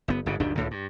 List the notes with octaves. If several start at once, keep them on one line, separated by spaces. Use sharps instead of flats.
F#1 B3
G1 G#2 C#3
D1 G1 D#3 D4
C#2 A2 D3
G2